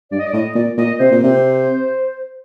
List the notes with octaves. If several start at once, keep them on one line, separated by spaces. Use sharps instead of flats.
G2 D5
D#5
D5
A2 D#5
A#2 D5
A#2 D#5
C3 C5
A#2
C3